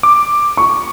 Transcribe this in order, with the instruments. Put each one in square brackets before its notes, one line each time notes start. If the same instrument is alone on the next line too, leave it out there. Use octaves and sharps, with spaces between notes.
[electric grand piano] D6
[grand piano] C#6